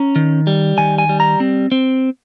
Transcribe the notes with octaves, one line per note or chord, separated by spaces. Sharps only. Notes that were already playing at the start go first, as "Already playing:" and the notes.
Already playing: C#4 A#5
D#3
G3
D#3 G#5
G#5
G3
A#5
C4
C4